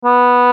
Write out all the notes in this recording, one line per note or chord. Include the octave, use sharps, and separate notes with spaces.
B3